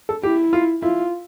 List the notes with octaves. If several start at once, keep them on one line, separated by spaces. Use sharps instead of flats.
A4
E4 G4
F4
E4 F4